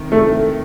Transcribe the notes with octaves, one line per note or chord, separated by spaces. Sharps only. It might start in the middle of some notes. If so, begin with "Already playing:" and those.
Already playing: C3 D#3
A3